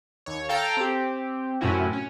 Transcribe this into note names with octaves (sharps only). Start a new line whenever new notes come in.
D#2 C#5
A4 F5 G5 A5 A#5
C4 G4
F#2 A2 C3 C#4 E4 F#4
C#4